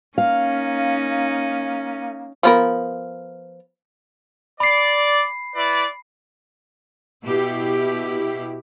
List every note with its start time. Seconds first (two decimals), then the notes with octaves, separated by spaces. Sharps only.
0.18 A#3 C#4 D#4 F5
2.43 F3 B3 A#4
4.60 D5 B5 C7
5.55 E4 B4 D5
7.26 B2 E4 G4